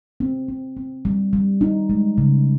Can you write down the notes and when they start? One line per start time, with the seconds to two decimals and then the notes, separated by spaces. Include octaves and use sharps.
0.20 C4
0.48 C4
0.77 C4
1.05 G3
1.33 G3
1.61 D#4
1.90 G#3
2.18 C#3